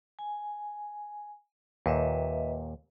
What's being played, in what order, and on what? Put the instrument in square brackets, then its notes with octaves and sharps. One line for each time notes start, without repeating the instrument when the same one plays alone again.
[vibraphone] G#5
[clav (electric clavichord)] D#2 A#2 [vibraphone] B4 D#5 E5